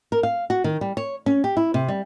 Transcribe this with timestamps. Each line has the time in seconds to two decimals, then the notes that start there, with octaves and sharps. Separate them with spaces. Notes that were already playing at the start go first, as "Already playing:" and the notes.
0.12 A#4
0.23 F5
0.50 F#4
0.64 D#3
0.81 G3
0.97 C#5
1.26 C#4
1.44 G4
1.57 E4
1.74 C3
1.89 G3